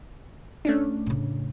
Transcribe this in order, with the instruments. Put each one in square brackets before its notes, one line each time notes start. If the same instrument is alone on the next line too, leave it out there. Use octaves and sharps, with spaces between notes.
[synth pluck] A3 C#4 D4
[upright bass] A2 C#3